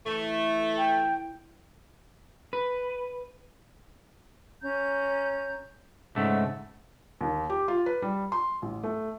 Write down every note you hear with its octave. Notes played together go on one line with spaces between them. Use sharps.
E3 A3
G5
B4
C#4 A#5 G6
G#2 C#3 A3 F#5 E6
D#2
G4
F4
B4
G3
C6
A1
A3